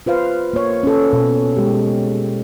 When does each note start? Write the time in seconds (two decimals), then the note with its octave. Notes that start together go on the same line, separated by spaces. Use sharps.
0.06 F4 B4 C5 F5
0.53 A#3 C#5
0.83 C#4 A4
1.13 B2
1.57 G#3 G4